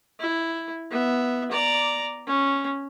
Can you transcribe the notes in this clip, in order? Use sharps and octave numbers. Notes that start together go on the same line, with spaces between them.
E4
B3 E5
D5 A#5
C#4